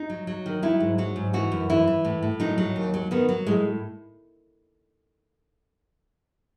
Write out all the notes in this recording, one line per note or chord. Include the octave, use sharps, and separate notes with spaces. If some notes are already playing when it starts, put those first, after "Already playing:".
Already playing: D#4
F#3
F#3
D#3
F#3 E4
G#2
F#3 F#4
G#2
E3 F#4
F#2
E3 E4
E3
A2
A2
F#3 D#4
F#3
D#2
F#3
D#3 B3
F#3
A2 G#3